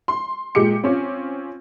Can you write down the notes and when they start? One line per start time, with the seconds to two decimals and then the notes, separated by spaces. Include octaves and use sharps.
0.08 C6
0.55 A#2 G#3 G4 D6 C#7
0.84 C4 C#4 F4